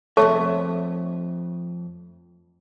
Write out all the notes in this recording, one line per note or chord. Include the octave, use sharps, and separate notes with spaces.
F2 A3 A4 C#5 E5 A5 C#6